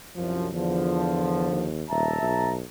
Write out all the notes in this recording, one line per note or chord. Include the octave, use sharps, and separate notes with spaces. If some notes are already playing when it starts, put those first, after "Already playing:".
C2 F#2 F3
E2 D3 F3
D#2
D#1 E5 A5 A#5
B1